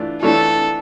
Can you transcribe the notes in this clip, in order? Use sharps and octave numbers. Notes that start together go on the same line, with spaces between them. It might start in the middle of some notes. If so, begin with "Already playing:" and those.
Already playing: E3 A3 D4 F4
E3 A3 D4 F4 A4 C#5